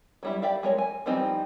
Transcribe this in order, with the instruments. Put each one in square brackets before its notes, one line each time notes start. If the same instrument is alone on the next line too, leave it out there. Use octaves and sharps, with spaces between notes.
[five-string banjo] F#3 G3 E4
G4 D5 E5 F5
G3 G#3 A#4 C#5
G#5
E3 F3 G3 C4 D#4